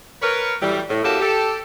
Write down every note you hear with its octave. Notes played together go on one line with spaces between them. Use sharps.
A#4 B4 C#5
A2 E3 F#3 G3
A2
A#3 C#4 E4 F#4 G4 A4
G4 A4